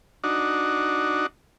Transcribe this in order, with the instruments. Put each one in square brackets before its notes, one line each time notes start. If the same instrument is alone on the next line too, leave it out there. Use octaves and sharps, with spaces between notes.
[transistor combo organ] D4 D#4 F#4